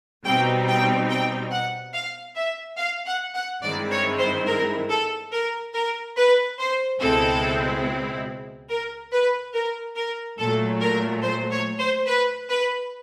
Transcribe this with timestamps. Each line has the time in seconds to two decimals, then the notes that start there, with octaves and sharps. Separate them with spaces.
0.25 B2 G3 C4 D#4 G5
0.68 G5
1.09 G5
1.51 F#5
1.94 F5
2.36 E5
2.78 F5
3.06 F#5
3.35 F#5
3.63 G2 D#3 G#3 C4 E4 D5
3.91 C#5
4.19 C5
4.47 A#4
4.90 A4
5.32 A#4
5.74 A#4
6.16 B4
6.58 C5
7.01 C#2 B2 G#3 C4 E4 A4
8.69 A#4
9.12 B4
9.53 A#4
9.96 A#4
10.38 A#2 F#3 A3 A4
10.81 A#4
11.23 C5
11.51 C#5
11.79 C5
12.07 B4
12.49 B4